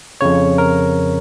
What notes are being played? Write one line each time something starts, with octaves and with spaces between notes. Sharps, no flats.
F2 C#3 C#5
A#4